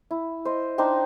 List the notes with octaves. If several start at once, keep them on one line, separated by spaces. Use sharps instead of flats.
E4
C5 D#5
D4 D#4 C5 G5